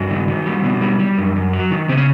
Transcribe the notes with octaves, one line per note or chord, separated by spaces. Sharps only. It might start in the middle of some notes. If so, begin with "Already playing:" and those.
Already playing: G2 F#4
D#3
D#3
G3
B2
G3
G3
F#2
F#2
F#3
D#3
C#3 C4
C#4